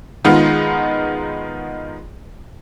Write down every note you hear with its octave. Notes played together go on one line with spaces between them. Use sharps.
D#3 G#3 B3 D#4 F4